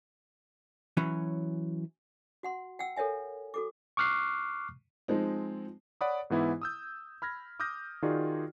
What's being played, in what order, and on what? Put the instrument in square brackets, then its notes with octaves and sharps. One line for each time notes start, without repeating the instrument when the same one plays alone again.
[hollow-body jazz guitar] E3 F#3 C#4
[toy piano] F#4 F#5 C6
F#5 G5 E6
A4 A#4 C#5 E5 G#5
F#4 A4 D6
[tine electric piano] C#6 D6 F6 F#6 C7
[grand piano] F3 G#3 C4 D#4
[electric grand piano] C#5 D5 F#5 B5 D#6
G#2 E3 B3 E4
D#6 E6 G6
B5 F6 G#6 A#6
D6 D#6 F6 G6 A#6
D#3 D#4 F4 F#4 G#4 D5